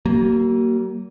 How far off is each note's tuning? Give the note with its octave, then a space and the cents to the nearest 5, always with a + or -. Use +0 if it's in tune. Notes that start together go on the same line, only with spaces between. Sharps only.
F#3 +45 A#3 -5